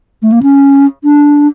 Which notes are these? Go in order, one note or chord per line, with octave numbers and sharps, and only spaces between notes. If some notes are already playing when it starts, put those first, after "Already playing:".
A3
A#3
C#4
D4